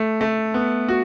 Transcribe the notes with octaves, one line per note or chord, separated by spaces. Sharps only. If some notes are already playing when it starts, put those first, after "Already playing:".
Already playing: A3
A3
B3
F#4